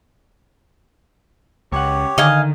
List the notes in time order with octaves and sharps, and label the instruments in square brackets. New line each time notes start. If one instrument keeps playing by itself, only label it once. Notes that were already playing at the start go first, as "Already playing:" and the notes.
[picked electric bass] C#2 [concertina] G4 C#5 [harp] F#5 C#6
[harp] D3 [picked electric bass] D#3 [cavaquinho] D#5 F5 G#5